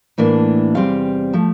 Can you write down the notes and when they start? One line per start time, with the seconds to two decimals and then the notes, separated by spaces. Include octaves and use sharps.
0.18 A2 E3 A#3 D4
0.75 E2 C3 G3 C4 F5
1.33 F3 A3